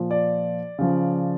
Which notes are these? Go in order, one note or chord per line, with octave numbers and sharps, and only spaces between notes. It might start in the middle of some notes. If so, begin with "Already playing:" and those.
Already playing: A#2 F3
D5
C#3 F3